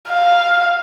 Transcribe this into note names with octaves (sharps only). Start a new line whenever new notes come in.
F5